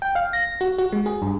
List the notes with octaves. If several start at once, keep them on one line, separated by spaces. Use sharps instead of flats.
G5
F5
A#6
F#4
F#4
G#3
G#4
G2